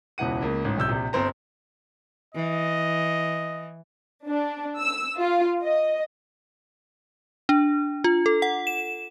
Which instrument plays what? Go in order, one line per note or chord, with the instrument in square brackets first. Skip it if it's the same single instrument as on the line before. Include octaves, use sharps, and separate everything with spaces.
[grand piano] E1 C#2 E3 F#5 D#7
C#2 A#3
A1 G#2
D1 C2 E6 G6
A#1 C3
G1 C4 C5 A#5
[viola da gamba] E3 [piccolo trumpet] D#5
[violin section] D4
E6
F4
D#5
[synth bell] D4
F4
A4
F#5
E7